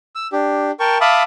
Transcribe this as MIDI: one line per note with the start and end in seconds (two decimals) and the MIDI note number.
0.15 0.27 88
0.32 0.71 62
0.32 0.71 67
0.80 0.98 70
0.80 0.98 79
0.80 0.98 81
0.80 0.98 85
1.01 1.23 76
1.01 1.23 77
1.01 1.23 81
1.01 1.23 83
1.01 1.23 86
1.01 1.23 87